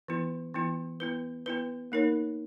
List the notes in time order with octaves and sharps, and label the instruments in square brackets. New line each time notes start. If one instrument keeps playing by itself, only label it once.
[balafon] E3 B3 E4
E3 B3 E4
B3 E4 B4
B3 E4 B4
A#3 D#4 A#4 C#5